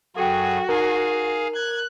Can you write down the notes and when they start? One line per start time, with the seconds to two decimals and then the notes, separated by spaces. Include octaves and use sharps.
0.16 F#2 F#4 G#4 A4 G5
0.69 D#4 G#4 A#4 F5
1.55 F#6 G#6